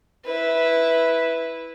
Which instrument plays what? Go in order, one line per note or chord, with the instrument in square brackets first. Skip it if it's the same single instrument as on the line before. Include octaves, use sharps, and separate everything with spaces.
[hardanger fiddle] E4 B4